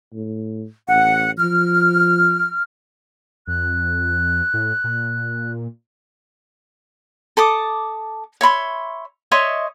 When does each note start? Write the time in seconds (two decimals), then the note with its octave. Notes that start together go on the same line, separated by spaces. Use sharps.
0.14 A2
0.88 A1 F#5
1.39 F3 F6
3.47 F2 F#6
4.54 A2
4.84 A#2
7.37 A4 A5 D6 D#6
8.41 C#5 E5 B5 C6
9.32 C#5 D#5 E5 C6